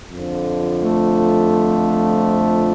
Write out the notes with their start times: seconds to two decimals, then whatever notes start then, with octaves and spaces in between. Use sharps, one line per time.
0.11 F2 D3 F3
0.84 A3